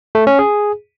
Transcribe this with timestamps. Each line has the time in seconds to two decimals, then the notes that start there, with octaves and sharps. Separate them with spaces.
0.15 A3
0.27 C#4
0.39 G#4